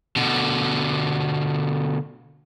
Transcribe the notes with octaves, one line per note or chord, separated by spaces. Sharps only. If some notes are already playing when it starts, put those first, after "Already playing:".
B2 D3